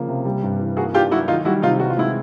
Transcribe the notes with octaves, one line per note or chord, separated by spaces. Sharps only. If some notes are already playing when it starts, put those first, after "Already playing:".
Already playing: C#3 F3 A#3
C3
G3
G2
E3
A#3 F#4 G#4
D4 F4 G4
F#3 E4 F#4
D#3 D#4 F4
G3 E4 F#4
C3 D#4 F4
E3 F#4
F4
G#3 E4